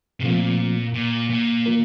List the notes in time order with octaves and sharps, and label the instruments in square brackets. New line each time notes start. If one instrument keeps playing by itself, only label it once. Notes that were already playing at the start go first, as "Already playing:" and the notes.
[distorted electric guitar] C3
[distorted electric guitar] A#2 [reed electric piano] F3 A3 C4 F4
[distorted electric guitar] A#2
A#2
[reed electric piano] D#3 A#3 F4 A#4